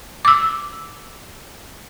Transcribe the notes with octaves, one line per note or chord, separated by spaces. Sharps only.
D6 E6